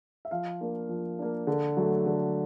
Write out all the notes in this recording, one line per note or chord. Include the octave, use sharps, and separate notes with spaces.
E5
F3 F5
A#3 D4
F3
A#3 D4
D3
F#3 A3
D3